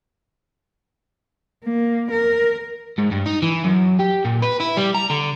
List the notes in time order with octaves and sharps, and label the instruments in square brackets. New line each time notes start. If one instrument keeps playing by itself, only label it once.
[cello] A#3
A#4
[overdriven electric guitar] G#2
G2
D#4
E3
F#2
G4
A#2
B4
E4
G3
A#5
D3